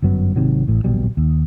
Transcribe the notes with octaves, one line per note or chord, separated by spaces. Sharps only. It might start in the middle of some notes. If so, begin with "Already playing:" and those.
G1 F#2 F#3 B3
G#1 C3 D#3 F#3
A1 A2
D1 A#1 B2 G3
D#2